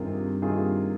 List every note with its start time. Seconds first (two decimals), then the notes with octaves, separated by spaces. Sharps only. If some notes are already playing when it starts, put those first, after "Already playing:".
Already playing: G2 C3 D#3 A#3 F4 G#4
0.42 C3 D#3 A#3 F4 G#4